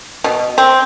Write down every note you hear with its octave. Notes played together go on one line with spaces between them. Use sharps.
B2
C4